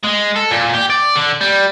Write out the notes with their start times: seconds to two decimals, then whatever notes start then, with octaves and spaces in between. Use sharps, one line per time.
0.03 G#3
0.36 A4
0.51 A#2
0.74 G4
0.90 D5
1.16 D3
1.41 G3